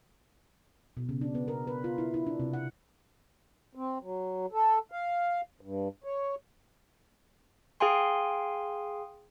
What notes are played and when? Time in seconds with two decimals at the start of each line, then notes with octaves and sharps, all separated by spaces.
0.97 B2
1.09 C#3
1.21 D4
1.35 B3
1.48 A#4
1.67 B4
1.84 F4
1.98 E4
2.14 E4
2.27 D4
2.40 C3
2.53 F#5
3.75 C4
4.02 F#3
4.52 A4
4.92 F5
5.61 G2
6.04 C#5
7.80 G#4 F5 G5 G#5 C6